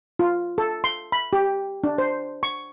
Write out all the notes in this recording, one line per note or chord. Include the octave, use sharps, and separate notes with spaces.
F4
A4
C6
B5
G4
D4
C5
C#6